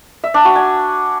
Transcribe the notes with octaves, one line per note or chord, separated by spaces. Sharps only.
E5
D4
F#4
G#5